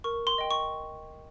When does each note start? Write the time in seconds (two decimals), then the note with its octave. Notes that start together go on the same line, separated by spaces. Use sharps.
0.04 A#4 C#6
0.27 C6
0.38 D#5 G5
0.51 C#6